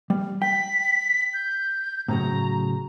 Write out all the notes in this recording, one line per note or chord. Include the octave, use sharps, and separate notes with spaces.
G3
G5 B6
G6
A2 C#3 F#3 A#5